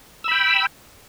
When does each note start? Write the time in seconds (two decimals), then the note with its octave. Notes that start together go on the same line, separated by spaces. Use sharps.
0.24 E6
0.28 B5
0.31 G5